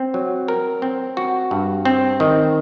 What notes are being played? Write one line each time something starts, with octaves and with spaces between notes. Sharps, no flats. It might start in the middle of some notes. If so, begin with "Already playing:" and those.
Already playing: C4
F#3
A#4
C4
F#4
G2
C4
D#3